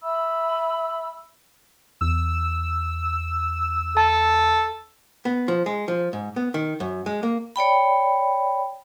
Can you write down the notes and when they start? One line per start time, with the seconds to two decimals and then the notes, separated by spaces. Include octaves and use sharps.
0.02 E5 B5 E6
2.01 E2 E6
3.97 A4 A5
5.25 B3
5.48 F3
5.66 G#3
5.88 F3
6.13 G#2
6.36 B3
6.54 D#3
6.80 F#2
7.06 G#3
7.23 A#3
7.56 C#5 D5 G5 B5